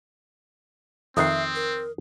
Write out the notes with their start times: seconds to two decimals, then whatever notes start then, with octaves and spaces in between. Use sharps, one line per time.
1.17 F2 D#3 C4 E5 D#6 F#6 C7
1.55 A#4